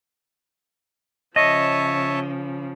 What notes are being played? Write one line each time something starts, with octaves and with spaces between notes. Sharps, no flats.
C#3 F3 C#5 D#5 E5 A5